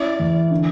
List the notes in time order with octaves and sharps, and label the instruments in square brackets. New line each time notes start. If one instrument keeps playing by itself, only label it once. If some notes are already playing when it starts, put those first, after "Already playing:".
Already playing: [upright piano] C#4 E4 [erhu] D5
[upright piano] E2
D3